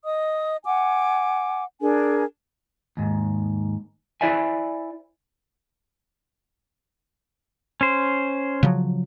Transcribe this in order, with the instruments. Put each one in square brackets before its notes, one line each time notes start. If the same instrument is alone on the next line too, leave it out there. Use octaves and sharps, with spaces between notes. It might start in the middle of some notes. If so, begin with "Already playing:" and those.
[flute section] D#5 D#6
F#5 G#5 D6
D4 G#4 A#4 G#5
[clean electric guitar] D#2 G#2
E4 C5 D5 E5 G#5
[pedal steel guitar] C#4 C5
[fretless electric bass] C#3 F3 F#3